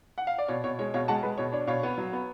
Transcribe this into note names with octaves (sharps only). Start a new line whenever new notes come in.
F#5
F5
D5
B2 C#5
B2 C#5
G#3 C#5
B2 C#5 F5
G#3 F#5 A5
G#3 B4
B2 C#5
D4 C#5
B2 C#5 F5
B3
F#3
B3